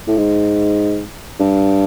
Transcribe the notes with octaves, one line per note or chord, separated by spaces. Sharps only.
A2
G#2
G2